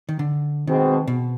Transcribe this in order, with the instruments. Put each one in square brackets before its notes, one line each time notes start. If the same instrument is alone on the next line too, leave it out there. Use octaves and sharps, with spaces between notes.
[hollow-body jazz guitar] D#3
D3
[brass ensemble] B2 G#3 C4 [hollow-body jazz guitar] D#3
[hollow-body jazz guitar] B2